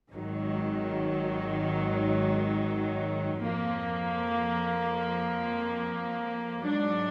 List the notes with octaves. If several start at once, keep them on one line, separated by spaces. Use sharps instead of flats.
G#1 G#2 D#3 F#3
F2 F3 A#3
G#2 F#3 D4